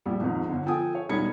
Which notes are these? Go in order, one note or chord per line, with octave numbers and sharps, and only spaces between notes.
A#1 G3
G#1 F2 G#2
G1 D3
F3 A4 G5 G#5 D#6
C#5
E1 G3 D#4 B5 G#6 C#7